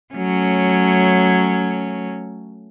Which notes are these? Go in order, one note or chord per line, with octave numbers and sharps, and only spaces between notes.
F#3 A3 C#4